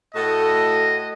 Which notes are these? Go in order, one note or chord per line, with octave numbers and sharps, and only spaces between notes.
A2 F#4 A4 D#5